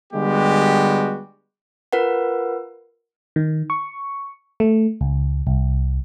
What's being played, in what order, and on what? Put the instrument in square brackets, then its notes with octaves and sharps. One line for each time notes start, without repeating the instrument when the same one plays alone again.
[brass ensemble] D3 G3 G#3 B3 F#4 G4
[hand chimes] F4 A#4 B4 F#5
[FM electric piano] D#3
C#6
A3
C#2
C2